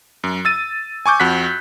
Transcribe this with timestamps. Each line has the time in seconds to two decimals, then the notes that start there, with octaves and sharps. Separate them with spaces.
0.24 F#2
0.45 E6 A6 D#7
1.06 G#5 C#6 D6 G6
1.20 F2 F#4 F#6 B6